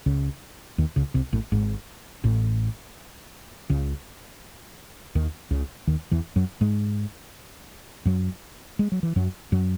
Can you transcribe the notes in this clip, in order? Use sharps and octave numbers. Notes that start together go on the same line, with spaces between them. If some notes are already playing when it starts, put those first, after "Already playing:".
C#2 C#3
D#2 D#3
C#2 C#3
C2 C3
A1 A2
G#1 G#2
A1 A2
C#2 C#3
D#2 D#3
C#2 C#3
D#2 D#3
E2 E3
F#2 F#3
G#2 G#3
F#2 F#3
G#3
F#3
E3
F#2 F#3
F#2 F#3